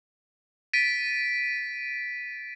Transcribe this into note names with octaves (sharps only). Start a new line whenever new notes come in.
A6 B6 D7 D#7